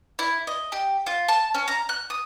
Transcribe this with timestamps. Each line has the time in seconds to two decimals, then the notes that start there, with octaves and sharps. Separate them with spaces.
0.19 E4
0.47 D#5
0.72 G4
1.07 F4
1.28 A5
1.54 C#4
1.68 A#5
1.89 F#6
2.10 D#6